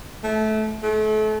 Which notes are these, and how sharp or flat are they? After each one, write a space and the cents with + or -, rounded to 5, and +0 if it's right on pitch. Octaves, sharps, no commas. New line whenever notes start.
A3 -20
A3 -35